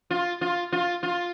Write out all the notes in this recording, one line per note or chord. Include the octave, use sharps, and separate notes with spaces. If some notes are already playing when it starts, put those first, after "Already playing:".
F4
F4
F4
F4